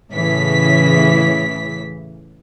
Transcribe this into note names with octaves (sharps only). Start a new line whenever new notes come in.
A2 C#3 E3 B6